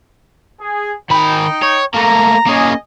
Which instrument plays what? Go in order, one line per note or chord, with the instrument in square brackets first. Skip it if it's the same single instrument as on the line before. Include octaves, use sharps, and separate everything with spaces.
[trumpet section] G#4
[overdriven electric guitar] D#3 B5 [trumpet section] D#4 G5
[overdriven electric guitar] C#5
[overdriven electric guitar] A3 A#3 [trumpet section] A#5
[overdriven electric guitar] A#3 C#4 [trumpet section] G#4 D#5 G#5